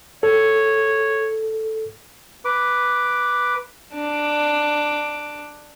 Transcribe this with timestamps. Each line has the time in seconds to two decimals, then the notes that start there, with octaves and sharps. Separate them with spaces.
0.23 A4 C#5
2.45 B4 D6
3.94 D4 D6